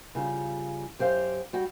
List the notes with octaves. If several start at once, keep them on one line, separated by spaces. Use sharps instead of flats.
C#3 G3 F4
F#2 G4 C5 F5
G3 F#4 G5